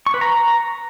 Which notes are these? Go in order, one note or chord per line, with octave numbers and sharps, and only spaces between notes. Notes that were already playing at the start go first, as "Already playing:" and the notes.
C#6
B4
A#5